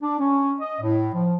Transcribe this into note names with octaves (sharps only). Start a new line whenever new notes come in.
D4
C#4
D#5
A2
F3